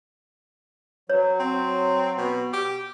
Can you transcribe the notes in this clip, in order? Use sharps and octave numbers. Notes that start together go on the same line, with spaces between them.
F#3 C#5
C4
B2
G4